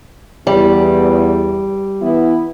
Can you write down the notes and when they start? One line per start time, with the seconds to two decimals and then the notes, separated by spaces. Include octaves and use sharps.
0.47 E2 G3
2.01 E3 B3 E4